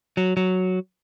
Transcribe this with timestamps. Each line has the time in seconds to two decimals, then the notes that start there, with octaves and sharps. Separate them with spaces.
0.17 F#3
0.37 F#3